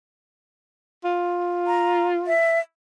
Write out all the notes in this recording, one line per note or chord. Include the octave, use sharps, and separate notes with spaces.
F4
A#5
E5